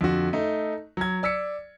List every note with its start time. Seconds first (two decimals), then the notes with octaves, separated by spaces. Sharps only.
0.01 F2 D3 F#4
0.33 A3 D#4
0.97 F#3 G#6
1.23 D5 E6 B6 C#7